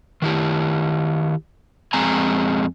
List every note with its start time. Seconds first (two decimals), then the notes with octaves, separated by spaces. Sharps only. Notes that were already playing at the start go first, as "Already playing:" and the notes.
0.22 D#3 E4 G4
1.93 F2 G#3 C4 G#5 A#5